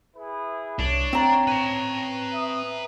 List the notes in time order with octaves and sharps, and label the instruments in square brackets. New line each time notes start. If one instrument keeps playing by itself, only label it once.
[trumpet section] E4 G#4 B4
[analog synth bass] C2 [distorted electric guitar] D4 [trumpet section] C#5
[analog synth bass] C4 [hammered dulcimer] G5 A#5
[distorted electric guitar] B4 A5
[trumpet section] E5 D#6